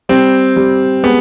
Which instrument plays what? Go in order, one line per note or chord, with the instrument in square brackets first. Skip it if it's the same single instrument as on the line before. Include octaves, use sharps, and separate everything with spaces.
[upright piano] G3 [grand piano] C4
[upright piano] G3
[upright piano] G#3 [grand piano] B3